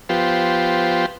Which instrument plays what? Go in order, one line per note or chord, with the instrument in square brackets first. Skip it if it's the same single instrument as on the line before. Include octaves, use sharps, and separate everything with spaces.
[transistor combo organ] F3 B3 F4 G4 C5